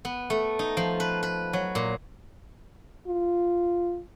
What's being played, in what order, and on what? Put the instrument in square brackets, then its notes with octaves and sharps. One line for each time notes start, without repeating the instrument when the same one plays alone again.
[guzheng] B3
A3
D#4
F3
B4
B4
F#3
A#2
[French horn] F4